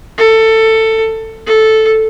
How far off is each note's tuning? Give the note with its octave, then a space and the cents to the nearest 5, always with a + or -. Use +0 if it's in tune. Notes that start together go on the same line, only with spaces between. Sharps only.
A4 +15
A4 -5